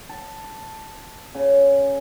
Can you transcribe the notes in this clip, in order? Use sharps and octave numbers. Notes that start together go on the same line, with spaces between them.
A5
C#3